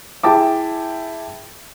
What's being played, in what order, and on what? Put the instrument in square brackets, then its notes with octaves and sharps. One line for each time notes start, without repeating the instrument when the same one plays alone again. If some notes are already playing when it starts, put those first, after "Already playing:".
[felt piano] E4 G#4 G5 A5 D6